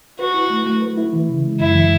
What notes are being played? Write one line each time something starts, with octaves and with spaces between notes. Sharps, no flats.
F#4 B4
E4
A3
A3
B4
E4
E3
C#3
G#3
F#2 E4
E3